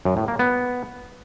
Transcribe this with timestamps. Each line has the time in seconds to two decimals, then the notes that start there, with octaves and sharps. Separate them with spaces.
0.05 F#2
0.17 A2
0.28 A#3
0.39 B3